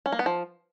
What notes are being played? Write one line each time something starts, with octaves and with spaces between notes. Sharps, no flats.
C#4
A#3
B3
F3